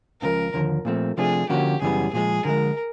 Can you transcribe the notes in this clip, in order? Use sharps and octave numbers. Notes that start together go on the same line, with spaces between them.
C#2 C#3 F3 A#4
D#2 D3 F3
A#2 F3 A3 C4
C3 F3 A3 D4 G#4
D3 F3 A#3 C#4 F#4 G4
F#2 C#3 E3 G3 B3 G#4
A#2 F3 G#3 G#4
D3 F3 G#3 A#4